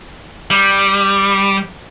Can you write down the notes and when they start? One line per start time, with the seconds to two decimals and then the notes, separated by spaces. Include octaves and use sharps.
0.51 G3